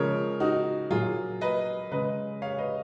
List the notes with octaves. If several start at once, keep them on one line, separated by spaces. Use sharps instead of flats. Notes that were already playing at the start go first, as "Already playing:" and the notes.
Already playing: C#3 F3 G#3 A#4 C#5
D#4 F#4
A#2 F#3 F4 G#4
B4 D#5
C#3 G#3 B4 D#5
C#5 F5
B4 D#5